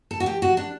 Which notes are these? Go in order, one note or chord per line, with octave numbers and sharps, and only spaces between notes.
A4
F#4
G4
F#4
D4